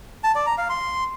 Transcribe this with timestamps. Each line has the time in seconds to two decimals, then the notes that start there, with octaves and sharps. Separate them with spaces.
0.24 A5
0.35 D5
0.47 A#5
0.58 F5
0.69 C6